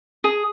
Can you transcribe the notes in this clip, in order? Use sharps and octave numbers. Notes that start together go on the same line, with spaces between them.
G#4